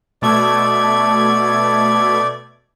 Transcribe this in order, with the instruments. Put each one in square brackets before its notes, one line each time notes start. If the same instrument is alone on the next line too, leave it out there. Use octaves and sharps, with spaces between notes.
[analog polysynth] B2 A3 G#6 [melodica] D5